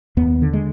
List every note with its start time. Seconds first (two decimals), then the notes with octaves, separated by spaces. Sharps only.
0.17 D#2 B3
0.42 D3
0.53 G#3